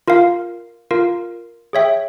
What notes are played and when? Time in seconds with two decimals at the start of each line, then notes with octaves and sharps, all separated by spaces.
0.08 F4 A#4 F5
0.91 F4 A#4 F5
1.73 G#4 C#5 E5 G5